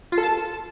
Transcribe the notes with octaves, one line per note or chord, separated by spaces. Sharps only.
F4
A4
A5